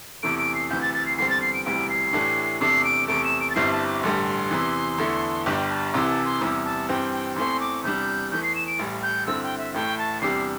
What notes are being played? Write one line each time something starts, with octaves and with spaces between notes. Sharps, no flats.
E2 C3 E3 A3 D7
D7
C7
D2 C3 E3 G6
A6
A6
C7
E2 D3 G3 C4 C7
A6
C7
D7
E1 D2 C3 E3 G3 D7
C7
A2 E3 A3 D4 G4
E2 C3 A3 D4 C7
D7
E2 C3 A3 D7
E7
D7
A6
G1 G2 G3 C4 E4 C7
A5
D6
A1 G2 D3 G3 C6
E2 C3 E3
E2 D3 A3 E4
G1 G2 G3 D4 G4 G5
A5
C2 C3 E3 C6
A5
C6
E2 C3 G3 E4
A5
G2 E3 C4 G4 G5
G5
E2 E3 A3 C4 C6
D6
E2 C3 G3 D4 G6
E2 E3 A3 G6
C7
E7
D7
A1 A2 G3
G6
G2 D3 C4 E4 E6
G5
E5
A1 A2 A3 G5
A5
E2 C3 G3 D4 G4 C7